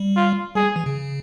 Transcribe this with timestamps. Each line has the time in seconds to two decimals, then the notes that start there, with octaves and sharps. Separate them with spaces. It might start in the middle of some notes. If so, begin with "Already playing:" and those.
Already playing: G3
0.16 F4
0.55 G3 G#4
0.76 E3
0.86 C#3